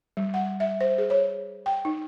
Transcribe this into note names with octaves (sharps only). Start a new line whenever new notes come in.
G3
F#5
E5
C5
G#4
C#5
G5
D#4